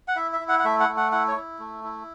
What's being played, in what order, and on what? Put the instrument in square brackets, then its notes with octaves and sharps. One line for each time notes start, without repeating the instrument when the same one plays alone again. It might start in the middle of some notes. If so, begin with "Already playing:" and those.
[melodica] F#5
E4 E5
E5
E4
F#5
F#5
A3 E5
F#5
A3
F#5
E4 F#5
C#5
E4
A3
E4